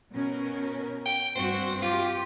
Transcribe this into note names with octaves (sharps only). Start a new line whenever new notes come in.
B2 C#4 A#4
G5
G2 C4 F#4 C5
F4 G4